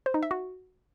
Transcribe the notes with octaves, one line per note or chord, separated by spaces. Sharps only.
C5
D#4
E5
F#4